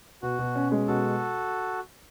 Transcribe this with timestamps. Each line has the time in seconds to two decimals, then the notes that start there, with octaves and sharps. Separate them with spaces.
0.22 B2 F#4
0.39 B2
0.55 C#4
0.72 G#3
0.87 B2 F#4 A4